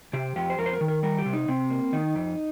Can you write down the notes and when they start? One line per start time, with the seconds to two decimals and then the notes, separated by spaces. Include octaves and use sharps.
0.13 C3 G4
0.36 F2 G4
0.50 C5
0.58 F2 A#4
0.66 C5
0.73 A#4
0.81 D#3
0.88 A#4
1.03 G3 A#4
1.18 G4
1.26 C3
1.33 D#4
1.48 C3 C4
1.70 A#3
1.93 D#3 D#4
2.15 F2